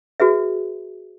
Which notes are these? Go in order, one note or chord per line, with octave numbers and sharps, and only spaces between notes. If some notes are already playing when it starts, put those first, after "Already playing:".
F#4 G#4 B4 E5